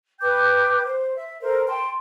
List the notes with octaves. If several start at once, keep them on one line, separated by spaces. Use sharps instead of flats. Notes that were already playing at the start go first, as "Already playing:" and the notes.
B4 G5 D6 G6
C5
E5
A4 A#4 C5
G5 A5 C6